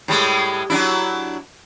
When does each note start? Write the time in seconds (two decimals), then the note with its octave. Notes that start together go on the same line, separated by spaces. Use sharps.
0.08 A2 G3 G#3
0.70 F#3 D4 E4